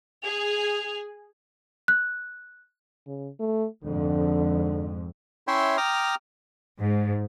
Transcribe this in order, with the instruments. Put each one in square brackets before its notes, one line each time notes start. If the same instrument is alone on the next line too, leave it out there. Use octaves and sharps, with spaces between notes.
[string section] G#4 [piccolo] F7
[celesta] F#6
[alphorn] C#3
A3
[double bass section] F2 G#2 [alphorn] D3
[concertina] C#4 E4 C#5 E5 G5 C6
G5 A#5 D6 D#6 F6
[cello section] G#2